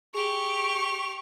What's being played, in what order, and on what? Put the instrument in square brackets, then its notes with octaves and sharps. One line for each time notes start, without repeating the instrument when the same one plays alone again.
[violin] G4 F7 [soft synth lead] G#4 [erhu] C#6